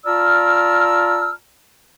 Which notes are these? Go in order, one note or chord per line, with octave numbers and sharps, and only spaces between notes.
F4 D5 A5 A#5 E6 F6